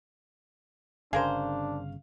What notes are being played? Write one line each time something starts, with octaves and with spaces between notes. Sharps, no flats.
G1 C#3 D4 G#4 A#4 C5 F5